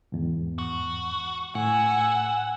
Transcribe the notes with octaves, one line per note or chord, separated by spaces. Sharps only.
E2 G#2
F#4
A2 F#5 G#5 E6